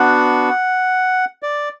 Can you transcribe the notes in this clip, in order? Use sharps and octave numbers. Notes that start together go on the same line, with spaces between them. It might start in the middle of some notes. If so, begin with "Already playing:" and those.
Already playing: B3 D4 F#4 F#5
D5